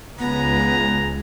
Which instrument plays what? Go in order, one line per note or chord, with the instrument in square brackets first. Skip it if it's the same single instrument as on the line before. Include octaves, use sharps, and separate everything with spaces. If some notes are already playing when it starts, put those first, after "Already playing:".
[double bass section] C#2 [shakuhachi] B3 [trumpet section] B4 G#5 A#5